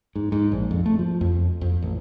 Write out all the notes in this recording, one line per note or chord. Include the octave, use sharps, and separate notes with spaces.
G#2
G#2
A#1
F2
A3
F3
F2
F2
A1